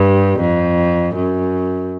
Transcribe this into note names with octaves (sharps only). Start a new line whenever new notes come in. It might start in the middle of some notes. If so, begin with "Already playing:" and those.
Already playing: G2
F2
F#2